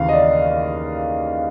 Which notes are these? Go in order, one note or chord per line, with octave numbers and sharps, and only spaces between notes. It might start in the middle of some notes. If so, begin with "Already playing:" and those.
Already playing: D#2 C#3 E3 F5
D#5
D5